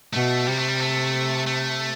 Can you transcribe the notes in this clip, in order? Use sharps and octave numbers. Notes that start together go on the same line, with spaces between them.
B2 A3
C3 G3
A3
G3
A3
A3